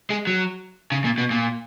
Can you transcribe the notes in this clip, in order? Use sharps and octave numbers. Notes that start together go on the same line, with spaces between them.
G#3
F#3
C#3
A#2
B2
A#2